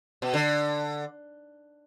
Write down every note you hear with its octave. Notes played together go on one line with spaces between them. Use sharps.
B2
D3